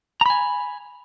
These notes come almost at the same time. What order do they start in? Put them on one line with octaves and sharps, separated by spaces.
A#5 B5 G#5